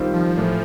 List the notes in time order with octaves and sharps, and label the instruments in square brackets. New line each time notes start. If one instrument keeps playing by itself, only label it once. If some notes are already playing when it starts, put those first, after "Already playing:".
Already playing: [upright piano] D#3 G3 C4 F4
[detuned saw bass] F3
[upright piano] A2 E3 A3 C4